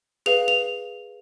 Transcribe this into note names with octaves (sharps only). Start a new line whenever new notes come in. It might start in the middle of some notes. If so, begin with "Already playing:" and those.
G#4 B4 F5 F7
F7